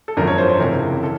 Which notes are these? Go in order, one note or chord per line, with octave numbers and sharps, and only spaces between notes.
A4
G#1 F#2 D3 F3 A#4
C#5
C5
C5
C#2 C3 E3 A#4
A4